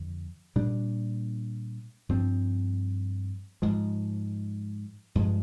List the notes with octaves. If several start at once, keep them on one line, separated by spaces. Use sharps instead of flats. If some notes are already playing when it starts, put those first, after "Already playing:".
Already playing: F2 D3
A#2 G3 D4
G2 F3 C4
G#2 F3 G#3
G2 F3 G#3